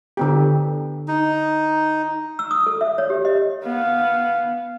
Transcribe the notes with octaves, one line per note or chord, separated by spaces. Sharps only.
D3 B3 G4
D#4
E6
D#6
A4
E5
C#5
G4
D#5
B3 F5